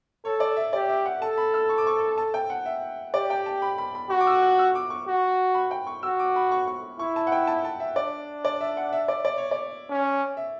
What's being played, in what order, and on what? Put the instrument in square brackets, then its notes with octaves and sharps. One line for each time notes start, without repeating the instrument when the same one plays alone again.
[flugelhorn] A4 [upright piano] C#5
[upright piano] D5
E5
[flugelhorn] G4 [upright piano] D5
[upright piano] E5
F#5
[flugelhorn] A4 [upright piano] A5
[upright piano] B5
E6
C#6
D6
C#6
A5
G5
F#5
E5
[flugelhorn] G4 [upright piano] D5
[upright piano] G5
A5
B5
B5
B5
[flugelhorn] F#4 [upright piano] C#6
[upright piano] D6
E6
F#6
E6
D6
C#6
[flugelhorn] F#4
[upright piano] B5
G5
C#6
[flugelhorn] F#4 [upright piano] E6
[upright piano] D6
B5
C#6
C#6
[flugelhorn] E4 [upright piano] C#6
[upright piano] A5
F#5
G5
A5
A5
E5
[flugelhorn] D4 [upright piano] D5
[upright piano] D5
E5
F#5
E5
D5
D5
C#5
D5
[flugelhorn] C#4
[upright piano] E5